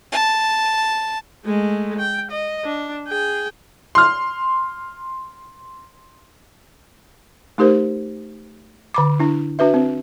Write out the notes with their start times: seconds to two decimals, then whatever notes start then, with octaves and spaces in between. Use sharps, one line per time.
0.12 A5
1.45 G#3 A3
1.99 G5
2.31 D#5
2.65 D4
3.08 G#4 G5
3.95 C6 F6
7.58 A3 D#4 G4 A#4 C5
8.94 D3 B5 D6
9.19 D4 E4
9.59 D4 F#4 B4 E5
9.74 C4